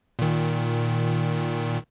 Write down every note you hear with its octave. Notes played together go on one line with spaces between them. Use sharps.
A#2 D#3